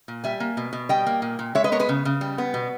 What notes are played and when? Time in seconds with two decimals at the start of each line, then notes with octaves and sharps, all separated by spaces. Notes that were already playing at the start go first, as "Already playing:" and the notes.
0.08 A#2
0.24 G3 E5 G#5
0.40 A#3
0.57 B2
0.73 B2
0.89 G3 D#5 G5
1.07 A#3
1.22 A#2
1.39 A#2
1.55 G#3 C#5 E5
1.64 B4 D#5
1.72 B3 A#4 C#5
1.79 G#4 B4
1.89 C#3
2.05 C#3
2.21 G3
2.38 B3
2.54 B2